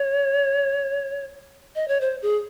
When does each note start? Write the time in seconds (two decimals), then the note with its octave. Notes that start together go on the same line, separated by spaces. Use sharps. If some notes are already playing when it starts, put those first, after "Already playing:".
Already playing: C#5
1.75 D#5
1.88 C#5
2.01 C5
2.22 G#4